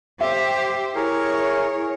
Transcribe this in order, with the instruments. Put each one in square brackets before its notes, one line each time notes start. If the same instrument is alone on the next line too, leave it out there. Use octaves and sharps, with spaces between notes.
[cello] G4 C5 [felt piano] E5
[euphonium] E4 [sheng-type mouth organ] G#4 A#4 [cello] C#5